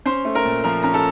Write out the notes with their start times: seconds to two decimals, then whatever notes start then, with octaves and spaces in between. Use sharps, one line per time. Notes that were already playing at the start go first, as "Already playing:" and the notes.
0.06 C#4 C5 C6
0.25 A3
0.35 A#4 A#5
0.45 A#2
0.64 F3 A#4 A#5
0.83 C#4 A#5
0.93 A4 A5